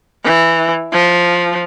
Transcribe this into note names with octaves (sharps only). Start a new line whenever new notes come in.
E3
F3